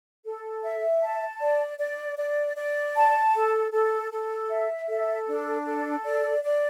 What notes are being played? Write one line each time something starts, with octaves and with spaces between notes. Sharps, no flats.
A4
E5
A5
D5
D5
D5
D5
A5
A4
A4
A4
E5
A4
D4
A4
D5
D5